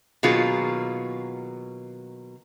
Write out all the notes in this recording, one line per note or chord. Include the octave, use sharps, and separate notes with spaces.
B2 D#3 F#3 A#3 F4 G#4